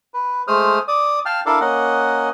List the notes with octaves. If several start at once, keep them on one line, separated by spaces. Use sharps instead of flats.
B4
G#3 A3 C5 D#6 F6
D5 D#6
F5 G5 A5 F6
D4 E4 A4 A#4 D5 F5
A#3 C#4 D#5 F#5